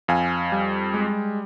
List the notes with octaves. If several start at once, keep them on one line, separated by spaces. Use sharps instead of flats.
F2 F5 G#5
G3
G#3